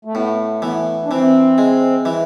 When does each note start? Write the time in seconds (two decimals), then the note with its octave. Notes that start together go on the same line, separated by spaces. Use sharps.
0.05 A3
0.15 A2 B3
0.62 E3 B3
1.05 D4
1.10 E3 C4
1.58 G#3
2.05 E3